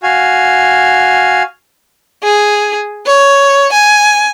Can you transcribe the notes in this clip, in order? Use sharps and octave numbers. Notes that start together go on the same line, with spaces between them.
F#4 F5 G#5
G#4
C#5
G#5